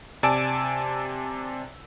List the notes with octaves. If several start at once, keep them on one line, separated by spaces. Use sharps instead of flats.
C3 D5 G#5 A5 E6 D7